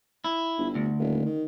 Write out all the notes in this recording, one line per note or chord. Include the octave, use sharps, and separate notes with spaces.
E4
G1
D2
D#1
D#3